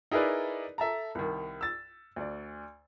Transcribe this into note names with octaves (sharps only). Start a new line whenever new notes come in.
D#4 E4 G#4 A#4 B4 D5
A4 E5 A5 A#5
C2 D#3
E6 A6
D2 D5